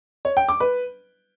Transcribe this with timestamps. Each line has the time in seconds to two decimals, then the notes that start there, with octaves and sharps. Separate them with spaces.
0.25 C#5
0.37 G5
0.49 D6
0.60 B4